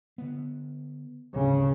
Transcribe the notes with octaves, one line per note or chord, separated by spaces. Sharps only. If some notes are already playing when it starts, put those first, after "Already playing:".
D3 B3
D2 G#2 C#3